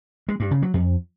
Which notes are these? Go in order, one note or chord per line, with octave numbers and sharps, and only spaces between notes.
G#3
G2
C#3
F#3
F2